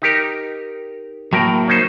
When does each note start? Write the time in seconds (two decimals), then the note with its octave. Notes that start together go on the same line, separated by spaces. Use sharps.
0.02 D#4 G4 A#4
1.33 A2 F#3 A#3 A#4 G5
1.68 C#4 D#4 C5